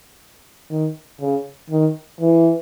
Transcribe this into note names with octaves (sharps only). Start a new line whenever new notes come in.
D#3
C#3
D#3
E3